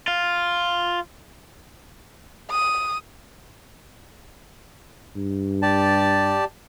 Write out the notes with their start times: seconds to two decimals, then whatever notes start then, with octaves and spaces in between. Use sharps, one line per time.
0.08 F4
2.51 D#6
5.16 G2
5.62 G4 D5 A5